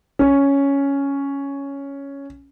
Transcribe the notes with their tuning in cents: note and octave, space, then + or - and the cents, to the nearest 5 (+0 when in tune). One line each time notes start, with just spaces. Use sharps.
C#4 +5